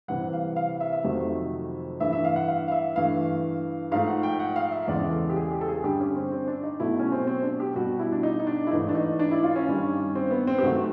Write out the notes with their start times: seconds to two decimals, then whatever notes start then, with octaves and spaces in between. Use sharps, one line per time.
0.08 C3 E3 G3 F#5
0.33 F5
0.56 F5
0.80 E5
0.93 E5
1.04 F2 C3 D#3 F#3 A3
2.00 G2 E3 A3 E5
2.13 E5
2.24 F5
2.36 F#5
2.48 F5
2.68 F5
2.72 E5
2.96 G2 E3 A3 F5
3.92 G#2 F3 A3 F5
4.07 F#5
4.23 G5
4.40 F#5
4.56 F5
4.71 E5
4.88 E2 C#3 E3 G#3 D5
5.11 A4
5.30 G4
5.36 G#4
5.52 G4
5.61 A4
5.68 G#4
5.84 G2 D3 G3 G4
6.00 C#4
6.16 C4
6.32 C4
6.48 D4
6.63 D#4
6.80 B2 F#3 A3 E4
6.99 C#4
7.12 C4
7.27 C4
7.43 D4
7.60 G4
7.75 B2 G3 F#4
7.99 E4
8.12 D4
8.23 D#4
8.40 D#4
8.47 D4
8.67 E4
8.71 G#2 E3 A3 D#4
8.89 D4
8.95 D#4
9.19 D4
9.31 E4
9.43 F4
9.56 C#4
9.67 G2 D#3 G3
10.15 C4
10.31 B3
10.47 C4
10.58 G4
10.63 C3 D#3 F#3 A3 F#4